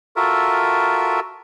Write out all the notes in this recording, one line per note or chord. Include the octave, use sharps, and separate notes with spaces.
F4 F#4 A4 A#4 E5